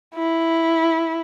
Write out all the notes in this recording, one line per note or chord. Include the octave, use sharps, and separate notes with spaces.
E4